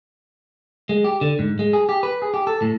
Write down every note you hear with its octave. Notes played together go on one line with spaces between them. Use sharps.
G#3
G4
D3
G#2
G#3
G#4
G4
B4
G#4
G4
A4
A2